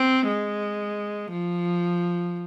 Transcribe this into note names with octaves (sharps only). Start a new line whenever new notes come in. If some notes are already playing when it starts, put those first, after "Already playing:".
Already playing: C4
G#3
F3